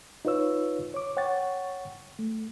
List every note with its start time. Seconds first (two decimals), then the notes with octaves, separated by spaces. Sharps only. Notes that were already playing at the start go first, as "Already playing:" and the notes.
0.25 D#4 F4 B4 C#5 E6
0.94 C#5 D6
1.17 C#5 F#5 G5 C#6 A6
2.19 A3